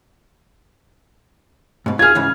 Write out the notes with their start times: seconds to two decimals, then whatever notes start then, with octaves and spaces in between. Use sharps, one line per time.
1.86 G#2 B2
1.99 F4 G#4 F6 G#6
2.15 G#2 C#3 E3